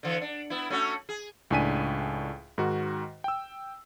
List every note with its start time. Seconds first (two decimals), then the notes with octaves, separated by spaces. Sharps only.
0.03 D3 E3
0.22 D4
0.50 B3 E4
0.70 A3 C#4 F#4
1.09 G#4
1.51 C#2 A2 D4 G#5 B6 D#7
2.58 G#2 D#3 F#4
3.24 G5 E6